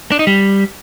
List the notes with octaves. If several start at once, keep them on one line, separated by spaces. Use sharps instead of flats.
D4
D#4
G3